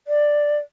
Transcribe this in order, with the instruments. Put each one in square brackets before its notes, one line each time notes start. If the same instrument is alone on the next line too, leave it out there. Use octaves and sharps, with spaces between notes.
[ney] D5